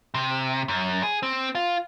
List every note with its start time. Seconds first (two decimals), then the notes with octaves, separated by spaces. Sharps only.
0.14 C3
0.68 F#2
1.03 G#4
1.23 C4
1.55 F4